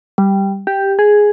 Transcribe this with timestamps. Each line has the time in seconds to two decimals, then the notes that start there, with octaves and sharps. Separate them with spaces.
0.18 G3
0.67 G4
0.99 G#4